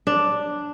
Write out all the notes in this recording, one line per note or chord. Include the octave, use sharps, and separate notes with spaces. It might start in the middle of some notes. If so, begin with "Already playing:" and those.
D4